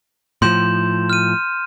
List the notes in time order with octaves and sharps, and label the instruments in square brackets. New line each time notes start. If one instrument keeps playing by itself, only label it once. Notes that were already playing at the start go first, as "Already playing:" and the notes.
[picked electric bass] A2 F3 [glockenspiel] C6 G6 E7
[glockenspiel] F6 D#7